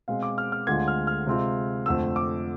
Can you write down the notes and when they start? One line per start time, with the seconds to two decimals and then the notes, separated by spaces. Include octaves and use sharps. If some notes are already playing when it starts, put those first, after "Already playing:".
0.08 B2 G#3 C4 F5
0.23 D6
0.38 F6
0.52 F6
0.67 D2 D3 G#3 C4 F4 G#6
0.88 F6
1.07 F6
1.27 C3 G#3 C4 F4
1.86 F2 D3 A3 E6
2.16 D6